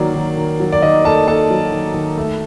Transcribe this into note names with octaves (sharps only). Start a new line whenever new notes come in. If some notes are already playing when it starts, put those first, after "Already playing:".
Already playing: D#3 F#3 A#3 D5
D#3
D#3
F#3
D5
D#3 D#5
A#3 A4 A5
A#3 A4 A5
F#3
D#3
D#3
A3